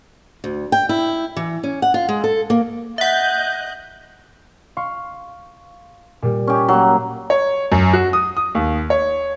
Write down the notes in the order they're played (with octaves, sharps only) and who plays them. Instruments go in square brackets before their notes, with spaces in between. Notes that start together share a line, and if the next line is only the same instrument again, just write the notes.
[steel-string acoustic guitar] D2
G5
E4
E3
C#4
F#5
F4
G#3
A4
A#3
[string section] D#5 F#6 G6 [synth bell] E5 F#5
[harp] F5 C6 C#6
A#2 G3
[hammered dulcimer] C#4 G4
F#3 A#3
[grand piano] C#5
F#2
F#4
D#6
D#6
D#2
C#5